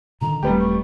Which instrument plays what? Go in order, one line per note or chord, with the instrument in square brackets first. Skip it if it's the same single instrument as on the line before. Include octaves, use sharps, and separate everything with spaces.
[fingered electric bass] A#2 D3 D#3 [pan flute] A#5
[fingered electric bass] D#1 A3 C4 [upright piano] G3 B3 G4
[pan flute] C#6